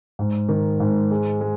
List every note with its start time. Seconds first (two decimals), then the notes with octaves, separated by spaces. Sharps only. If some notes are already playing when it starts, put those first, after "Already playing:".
0.19 G#2
0.49 D#3
0.80 G#2
1.11 G#3
1.41 G#3